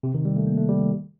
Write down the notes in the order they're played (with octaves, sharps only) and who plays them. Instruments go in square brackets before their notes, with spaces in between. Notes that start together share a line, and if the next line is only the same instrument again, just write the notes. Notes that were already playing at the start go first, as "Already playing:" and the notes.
[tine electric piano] C3
D#3
G3
A3
A#3
A3
G3
D#3